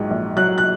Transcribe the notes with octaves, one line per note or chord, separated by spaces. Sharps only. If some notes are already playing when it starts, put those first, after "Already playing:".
Already playing: A#1 G#2 F#3
A#1
F#3 F#6
F#6